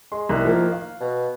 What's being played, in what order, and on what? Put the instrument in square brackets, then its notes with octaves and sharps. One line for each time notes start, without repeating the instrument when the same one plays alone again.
[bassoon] G#3 [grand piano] C6
[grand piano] C2 F#6 [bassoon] D#3
[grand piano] F3 A#3
F5
[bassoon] B2